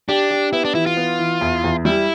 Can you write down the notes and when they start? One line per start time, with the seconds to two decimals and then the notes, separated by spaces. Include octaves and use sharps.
0.09 D4 G4
0.31 G4
0.53 B3 E4
0.65 D4
0.75 E3 E4
0.86 F4
0.97 B3
1.19 E3
1.41 E2
1.64 E2
1.85 G3 E4